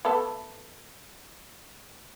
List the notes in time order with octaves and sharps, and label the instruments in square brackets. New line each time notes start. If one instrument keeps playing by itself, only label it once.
[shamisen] A3 B3 A4